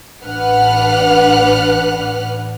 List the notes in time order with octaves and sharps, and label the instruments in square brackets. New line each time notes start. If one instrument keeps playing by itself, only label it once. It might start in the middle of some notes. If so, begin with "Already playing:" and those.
[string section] A1 D4 B4 F#5 F6 F#6